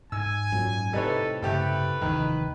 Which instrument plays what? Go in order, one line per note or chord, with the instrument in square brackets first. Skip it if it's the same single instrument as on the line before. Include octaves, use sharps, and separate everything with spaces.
[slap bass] G#2 [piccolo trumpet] G#5 [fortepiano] E6
[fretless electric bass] F#2 A#2 F#3
[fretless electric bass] A2 C3 G3 [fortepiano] D#4 B4 C#5 [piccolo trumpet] A4
[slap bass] G2 C#3 [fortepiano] A3 G4 A4 [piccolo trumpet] B4
[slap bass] F1 D#2 E3 [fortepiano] D#3